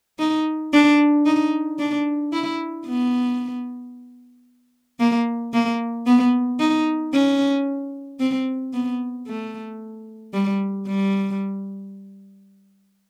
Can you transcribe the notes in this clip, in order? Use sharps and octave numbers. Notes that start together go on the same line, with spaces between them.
D#4
D4
D#4
D4
E4
B3
A#3
A#3
B3
D#4
C#4
C4
B3
A3
G3
G3